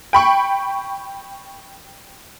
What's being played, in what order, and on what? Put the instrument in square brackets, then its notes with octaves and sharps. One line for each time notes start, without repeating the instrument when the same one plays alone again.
[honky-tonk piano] G5 B5 C#6